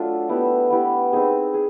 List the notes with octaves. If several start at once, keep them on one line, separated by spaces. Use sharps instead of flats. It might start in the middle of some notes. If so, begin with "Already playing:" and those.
Already playing: F#3 A3 D4 F4
B3 E4 G4
B3 E4 G4
C4 D#4 G#4
G#4